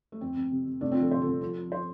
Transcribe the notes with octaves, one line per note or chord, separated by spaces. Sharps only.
A3
F2 C4
F2
C3
C3
C2 A3 D4
F3 C4 F4
A4
C2 C5
C2 F4 A4
F3 F4 A4
F3
F3 C5